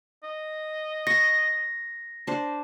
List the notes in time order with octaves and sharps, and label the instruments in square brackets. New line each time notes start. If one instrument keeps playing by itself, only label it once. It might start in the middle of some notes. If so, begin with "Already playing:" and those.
[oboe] D#5
[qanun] C#6 [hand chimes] A#6
[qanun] D4 C5